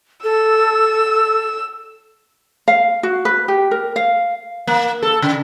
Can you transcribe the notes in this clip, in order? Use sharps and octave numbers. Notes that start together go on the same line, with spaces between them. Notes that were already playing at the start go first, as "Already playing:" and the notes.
A4 E6
F5
F#4
B4
G4
A#4
F5
A#3
A4
C#3